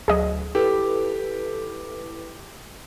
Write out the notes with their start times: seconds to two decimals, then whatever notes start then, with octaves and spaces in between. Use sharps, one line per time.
0.08 D2 F#3 G#4 D#5
0.55 E4 G4 A4 B4